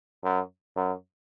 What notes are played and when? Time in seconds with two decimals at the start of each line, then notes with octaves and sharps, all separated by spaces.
0.24 F#2
0.77 F#2